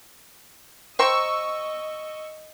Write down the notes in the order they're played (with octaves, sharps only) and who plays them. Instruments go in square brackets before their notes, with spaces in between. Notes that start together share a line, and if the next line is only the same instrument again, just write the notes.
[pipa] C5 G5 A#5 [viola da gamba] D#5 [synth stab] C#6 E6